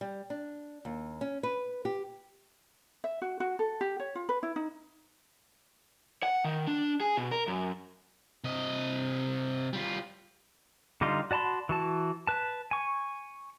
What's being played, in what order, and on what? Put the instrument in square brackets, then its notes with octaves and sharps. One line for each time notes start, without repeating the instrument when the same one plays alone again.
[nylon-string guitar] G3
D4
D#2
C#4
B4
G4
[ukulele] E5
F#4
F#4
A4
G4
C#5
F4
B4
E4
D#4
[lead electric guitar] F#5
D#3
D4
G#4
B2
A#4
F#2
[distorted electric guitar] C3 D#5
G3 F4
[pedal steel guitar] D3 G3 D#4 F4 C6
F#4 D5 A5 B5 C6
E3 F#4 A5
B4 A5
G#5 C#6